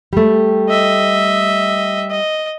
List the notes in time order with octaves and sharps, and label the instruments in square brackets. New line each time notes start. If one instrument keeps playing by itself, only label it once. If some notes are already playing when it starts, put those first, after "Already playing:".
[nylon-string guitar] G3 A3
[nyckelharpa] D#5 E5
D#5